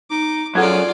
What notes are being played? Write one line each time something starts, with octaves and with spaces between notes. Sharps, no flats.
D#4 D6
F#2 F4 G#4 A4 D5 F#5 G#6